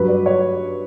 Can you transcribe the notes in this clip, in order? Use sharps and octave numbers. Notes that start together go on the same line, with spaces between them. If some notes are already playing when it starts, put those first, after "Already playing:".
Already playing: G2 F#3 B4
D5
C#5